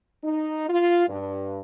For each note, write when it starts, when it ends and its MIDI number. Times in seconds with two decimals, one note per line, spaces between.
0.24 0.68 63
0.68 1.05 65
1.08 1.61 43